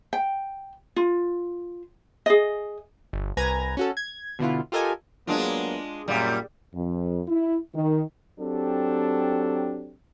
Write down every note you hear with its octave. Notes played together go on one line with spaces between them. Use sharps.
G5
F4
G#4 D#5
G1
C2 B4 G#5 A#5 G#6 A#6
C#4 F#4 A4
G#6
B2 D3 B3 E4 F4
F4 G4 A4 A#4 D#5 G#5
F#3 G#3 A#3 B3 D4 F4
F#2 A#2 G3
F2
E4
D#3
F#3 C4 D4 G4 A4